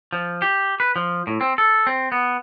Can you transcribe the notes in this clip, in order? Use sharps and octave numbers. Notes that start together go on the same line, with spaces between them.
F3
G4
B4
F3
A2
C4
A4
C4
B3